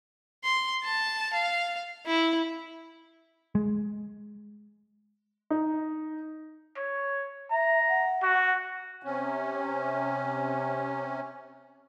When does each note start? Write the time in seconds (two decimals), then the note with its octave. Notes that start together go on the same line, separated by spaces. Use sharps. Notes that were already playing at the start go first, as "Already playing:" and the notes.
0.44 C6
0.84 A5
1.33 F5
2.06 E4
3.55 G#3
5.50 D#4
6.77 C#5
7.51 E5 A#5
7.88 F#5
8.23 F#4
9.03 C3 C#4